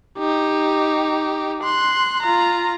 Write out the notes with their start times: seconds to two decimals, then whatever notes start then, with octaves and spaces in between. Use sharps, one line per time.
0.18 D#4 G4
1.63 C6 F#6
2.22 F4 A#5